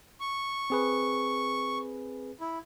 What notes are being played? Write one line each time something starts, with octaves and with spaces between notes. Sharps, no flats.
C#6
C4 G#4 B4
E4